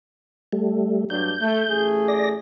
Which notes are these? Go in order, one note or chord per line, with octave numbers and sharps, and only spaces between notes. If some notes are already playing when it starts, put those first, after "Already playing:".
G3 A3
G2 F#3 D4 G6
A3
A1 A3 G#4
D5 A#6